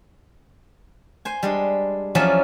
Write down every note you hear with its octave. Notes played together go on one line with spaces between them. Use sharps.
C5 G#5
G3 G#3 D4
E2 F3 F#3 C#4 D5 E5